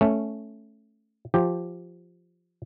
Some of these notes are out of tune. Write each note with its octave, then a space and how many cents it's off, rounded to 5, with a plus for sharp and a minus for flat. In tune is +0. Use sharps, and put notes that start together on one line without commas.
A3 +0 C#4 +0
F3 +0 G4 +0